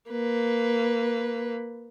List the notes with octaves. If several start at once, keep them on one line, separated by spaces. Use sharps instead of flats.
A#3 B4